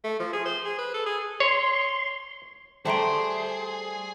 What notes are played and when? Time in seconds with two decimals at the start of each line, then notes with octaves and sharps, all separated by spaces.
0.04 A3
0.19 F3
0.33 G#4
0.45 C5
0.65 G#4
0.78 B4
0.94 A4
1.06 G#4
1.40 C#5 C6
2.85 G3 A3 G#4 C5 A5 A#5 C6 D7